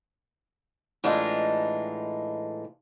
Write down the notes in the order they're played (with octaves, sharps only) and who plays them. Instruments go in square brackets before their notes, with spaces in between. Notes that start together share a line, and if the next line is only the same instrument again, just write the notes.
[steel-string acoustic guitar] A2 E3 G#3 D4 D#4 F4